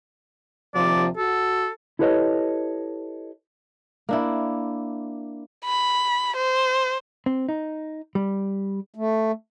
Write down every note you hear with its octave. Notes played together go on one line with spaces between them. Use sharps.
D#2 C3 F3 D5
F#4 A4
E4 G4 A4 B4 C#5 D#5
A#3 D4 E4
B5
C5
C4
D#4
G3
A3